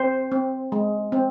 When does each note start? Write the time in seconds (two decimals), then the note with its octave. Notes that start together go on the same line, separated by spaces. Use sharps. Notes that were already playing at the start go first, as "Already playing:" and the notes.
Already playing: C4 C5
0.32 C4
0.72 G#3
1.12 C4